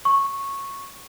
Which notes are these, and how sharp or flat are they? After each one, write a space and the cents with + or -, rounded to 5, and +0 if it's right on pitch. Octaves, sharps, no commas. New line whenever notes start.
C#6 -10